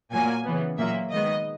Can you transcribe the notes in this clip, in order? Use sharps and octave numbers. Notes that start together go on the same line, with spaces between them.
A#2 F#3 A#3 G#5
C#3 E3 B3
A#2 F#3 A#3 E5
D#3 G#3 B3 D#5